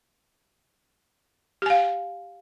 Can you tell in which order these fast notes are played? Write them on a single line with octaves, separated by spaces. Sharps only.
G4 G#5 F5